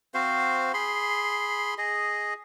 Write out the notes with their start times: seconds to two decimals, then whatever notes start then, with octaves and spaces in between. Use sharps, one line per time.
0.14 C4 F#4 C5 F5
0.74 G#4 B5 C6
1.78 G#4 D#5